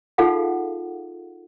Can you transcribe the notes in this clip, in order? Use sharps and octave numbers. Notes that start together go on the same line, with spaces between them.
D#4 F4 G#4 A4 F5 F#5